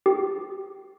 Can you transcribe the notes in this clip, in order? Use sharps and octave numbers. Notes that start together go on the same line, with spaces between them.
G4